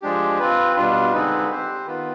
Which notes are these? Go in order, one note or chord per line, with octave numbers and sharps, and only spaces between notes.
F3 G#3 D4 G4
C4 F4 B4
B2 G3 D4 F4
D3 G#3 C4 D#4 B4
C4 G4 C5
D#3 B3 F4 B4